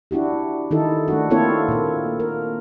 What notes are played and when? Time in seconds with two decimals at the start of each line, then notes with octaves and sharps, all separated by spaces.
0.11 D4 E4 F#4 G4
0.71 D#3 D#4 E4 A4
1.08 A3 D4 F#4
1.30 A#3 C4 E4 F4 A4 C#5
1.68 A#2 A#3
2.20 A#4